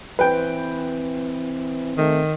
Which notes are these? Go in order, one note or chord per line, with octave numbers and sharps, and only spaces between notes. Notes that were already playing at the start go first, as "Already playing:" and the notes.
E3 C4 B4 G5
D#3 A3